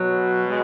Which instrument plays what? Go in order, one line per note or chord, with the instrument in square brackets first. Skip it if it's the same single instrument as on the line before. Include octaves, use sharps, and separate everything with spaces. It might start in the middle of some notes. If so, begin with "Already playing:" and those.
Already playing: [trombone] B2 [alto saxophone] F#3
[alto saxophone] G#3